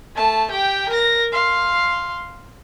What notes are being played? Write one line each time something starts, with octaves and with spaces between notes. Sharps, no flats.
A3 A5
G4 G5
A#4 A#6
F5 C6